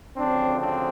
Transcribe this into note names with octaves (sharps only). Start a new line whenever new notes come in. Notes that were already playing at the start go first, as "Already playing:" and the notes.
D2 C#3 F3 C4 D4
C4 D4